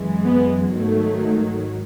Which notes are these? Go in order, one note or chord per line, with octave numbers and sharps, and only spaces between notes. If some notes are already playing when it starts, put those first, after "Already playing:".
Already playing: F#2 E3 G#3
B3
G#2 D#3 F#3 A3